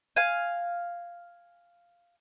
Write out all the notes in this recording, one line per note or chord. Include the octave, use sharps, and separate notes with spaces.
F5 G#5